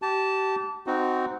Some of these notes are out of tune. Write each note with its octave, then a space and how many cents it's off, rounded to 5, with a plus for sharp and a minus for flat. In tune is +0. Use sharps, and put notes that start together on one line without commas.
G4 -30 A5 +0
C4 -15 D#4 +0 F#4 +0